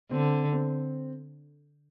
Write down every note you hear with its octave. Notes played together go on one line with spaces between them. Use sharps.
D3 C4
C4